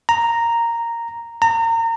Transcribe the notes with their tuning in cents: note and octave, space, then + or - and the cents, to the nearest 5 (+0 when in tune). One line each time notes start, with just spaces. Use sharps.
A#5 -5
A#5 -30